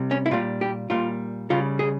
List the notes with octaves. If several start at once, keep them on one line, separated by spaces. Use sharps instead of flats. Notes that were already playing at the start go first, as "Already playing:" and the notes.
Already playing: C3 G3
C#4
E4
A#2 G3 F4
G4
A#2 G3 F4
C#3 G3 F4
G#4